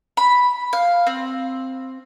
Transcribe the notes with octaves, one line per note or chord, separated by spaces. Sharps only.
B5
F5
C4